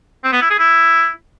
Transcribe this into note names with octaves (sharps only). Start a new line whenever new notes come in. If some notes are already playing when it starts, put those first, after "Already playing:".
C4
B3
E4
G#4
E4